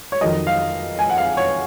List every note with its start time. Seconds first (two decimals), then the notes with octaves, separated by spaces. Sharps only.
0.12 C#5
0.21 F2 D#3 F#3 D#5
0.47 F5
0.99 G#5
1.10 F#5
1.18 F5
1.37 C#5